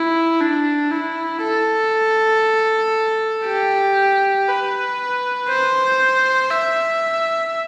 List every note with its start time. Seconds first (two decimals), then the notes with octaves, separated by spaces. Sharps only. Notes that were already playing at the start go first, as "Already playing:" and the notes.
Already playing: E4
0.41 D4
0.91 E4
1.43 A4
3.46 G4
4.48 B4
5.49 C5
6.51 E5